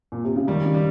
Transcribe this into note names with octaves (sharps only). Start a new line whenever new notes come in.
A#2
C3
C#3
D#3 G3
C#3
G3